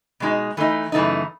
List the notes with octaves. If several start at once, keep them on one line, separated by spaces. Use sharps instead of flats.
B2 G#3 D#4 F#4
E3 A3 D#4
F#2 C#3 E3 A3 D#4